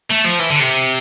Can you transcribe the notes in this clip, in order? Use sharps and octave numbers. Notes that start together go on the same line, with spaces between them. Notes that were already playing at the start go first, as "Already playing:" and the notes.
A3
F3
E3
D3
C3